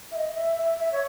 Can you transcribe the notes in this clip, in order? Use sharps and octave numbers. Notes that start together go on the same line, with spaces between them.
E5
D#5
E5
E5
E5
C#5